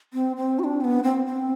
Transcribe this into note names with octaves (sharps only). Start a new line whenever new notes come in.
C4
C4
F#4
D4
C4
B3
C4
C4